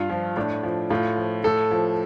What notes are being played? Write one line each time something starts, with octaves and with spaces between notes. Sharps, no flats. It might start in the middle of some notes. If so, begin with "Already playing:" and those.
Already playing: G2 F4
F3
A2 D4
F3
A2 F4
F3
A2 A4
F3